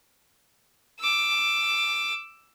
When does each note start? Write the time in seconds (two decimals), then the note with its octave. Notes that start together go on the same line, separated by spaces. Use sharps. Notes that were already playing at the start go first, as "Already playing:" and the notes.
1.00 D6 E6